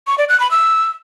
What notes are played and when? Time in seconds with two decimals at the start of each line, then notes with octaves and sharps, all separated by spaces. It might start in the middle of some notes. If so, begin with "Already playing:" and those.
0.07 C#6
0.18 D5
0.29 F#6
0.40 B5
0.51 E6